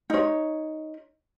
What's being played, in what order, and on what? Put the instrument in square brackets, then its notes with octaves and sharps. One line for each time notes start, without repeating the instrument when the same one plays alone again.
[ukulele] D#4 C#5